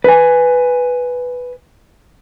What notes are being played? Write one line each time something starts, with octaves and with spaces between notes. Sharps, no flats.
B4 G#5